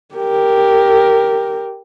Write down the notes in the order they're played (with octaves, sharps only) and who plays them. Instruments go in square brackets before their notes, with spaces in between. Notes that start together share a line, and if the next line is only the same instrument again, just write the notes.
[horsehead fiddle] G4 A#4